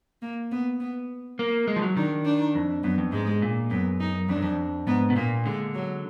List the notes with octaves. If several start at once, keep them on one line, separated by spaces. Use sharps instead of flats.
A#3
B3
B3
A#3
G#3
F3
F#3
D#3 D4
D4
F2
F#2 B3
F2
G#2 G#3
A#2
F#2 B3
D#4
F2 D4
F#2
F2
G#2 B3
B2
A#2 A#3
D3 G#3
F#3